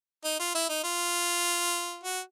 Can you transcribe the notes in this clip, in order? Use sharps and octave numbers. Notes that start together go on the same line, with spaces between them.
D#4
F4
E4
D#4
F4
F#4